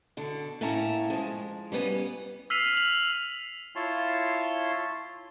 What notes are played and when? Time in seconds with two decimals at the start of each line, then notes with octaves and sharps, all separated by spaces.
0.17 B2 D3
0.61 A2 A#3 C#4 E5 A5 A#5
1.10 F3 G#3
1.72 G3 A#3 B3 C#4
2.50 E6 F6 B6 C7 D#7 F7
2.77 F7 F#7
3.76 E4 F4 C#5 A5 C6